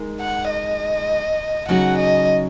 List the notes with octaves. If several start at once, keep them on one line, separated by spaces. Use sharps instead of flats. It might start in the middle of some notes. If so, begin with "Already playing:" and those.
Already playing: G#3 D#4 A#4
F#5
D#5
C#3 F#3 D#4 G#4 F#5
D#5